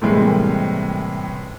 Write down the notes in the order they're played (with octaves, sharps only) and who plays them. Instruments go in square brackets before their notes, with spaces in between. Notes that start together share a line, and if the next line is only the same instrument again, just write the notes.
[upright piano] A2 C3 E3 G3 G#3 A#3